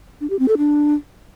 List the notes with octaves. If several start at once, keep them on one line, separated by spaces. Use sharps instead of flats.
D4
G4
C4
A4
D4